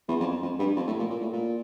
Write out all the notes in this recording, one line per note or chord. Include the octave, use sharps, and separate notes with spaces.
E2
F2
F2
F2
G2
F2
A2
A#2
A#2
A2
A#2